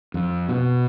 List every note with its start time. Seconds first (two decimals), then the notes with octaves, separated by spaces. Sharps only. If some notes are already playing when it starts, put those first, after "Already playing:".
0.14 F2
0.49 B2